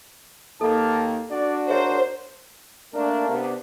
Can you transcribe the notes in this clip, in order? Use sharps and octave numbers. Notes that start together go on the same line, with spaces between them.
D#2 D#3 A#3 A4 A5
D4 F#4 D5
G#4 A#4 C5 C#5 E5
A3 A#3 D4 A#4
C3 B3 D4